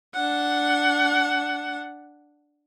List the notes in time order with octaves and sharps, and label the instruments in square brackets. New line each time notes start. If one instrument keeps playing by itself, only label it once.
[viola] D4 F#5